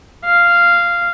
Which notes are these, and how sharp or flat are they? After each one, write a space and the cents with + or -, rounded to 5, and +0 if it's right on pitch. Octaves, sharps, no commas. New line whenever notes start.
F5 -10